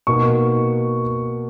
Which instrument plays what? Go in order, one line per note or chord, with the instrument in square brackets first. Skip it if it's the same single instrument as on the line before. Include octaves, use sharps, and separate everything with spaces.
[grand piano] B2 A#3 D#4 C#6